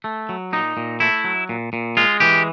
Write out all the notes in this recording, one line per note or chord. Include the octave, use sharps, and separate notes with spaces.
A3
F#3
A#2 D#4
A#2
A3 E4
F#3
A#2
A#2
G#3 F4
E3 G4